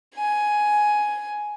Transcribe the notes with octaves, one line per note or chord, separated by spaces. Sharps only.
G#5